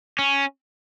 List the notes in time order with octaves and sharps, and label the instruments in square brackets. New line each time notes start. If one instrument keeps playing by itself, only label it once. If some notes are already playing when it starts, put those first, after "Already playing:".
[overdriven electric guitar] C#4